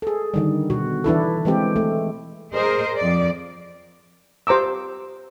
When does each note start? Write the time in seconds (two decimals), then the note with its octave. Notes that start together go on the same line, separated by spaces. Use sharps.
0.02 G#4 A4
0.34 D3 D#3 G3
0.70 B2 F#4
1.04 E3 D4 E4 A4
1.45 E3 G#3 C4 G4
1.76 A3
2.53 G#4 A#4 C5 D#5
2.97 F2 D5
4.47 G4 C5 A#5 D6 E6